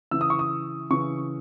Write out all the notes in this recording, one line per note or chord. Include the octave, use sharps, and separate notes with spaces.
C#3 E3 E6
D#6
C#6
D#6
C#3 E3 C#6